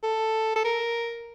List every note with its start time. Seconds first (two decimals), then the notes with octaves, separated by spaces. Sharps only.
0.03 A4
0.56 A4
0.64 A#4